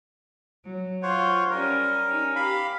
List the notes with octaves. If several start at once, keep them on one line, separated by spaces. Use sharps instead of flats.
F#3
F4 C5 C#5 F#5
G3 C#4 A#4
C#4 D#4
G4 F5 B5